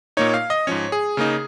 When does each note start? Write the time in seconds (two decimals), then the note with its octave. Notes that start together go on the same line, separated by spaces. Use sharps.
0.17 A#2 A#3 D#4 C#5
0.34 F5
0.50 D#5
0.67 G#2 F3 C#4 C#5
0.92 G#4
1.17 C#3 A#3 D#4